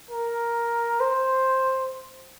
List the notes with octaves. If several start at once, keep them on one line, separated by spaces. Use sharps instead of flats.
A#4
C5